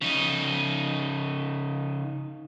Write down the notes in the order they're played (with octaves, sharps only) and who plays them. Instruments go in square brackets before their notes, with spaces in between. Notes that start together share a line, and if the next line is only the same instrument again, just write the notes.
[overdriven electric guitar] C#3 D#4